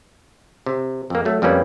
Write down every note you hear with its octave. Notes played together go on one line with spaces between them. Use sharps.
C3
F2 A#3
F#3 A3
F2 G3 A#3 C#4 B4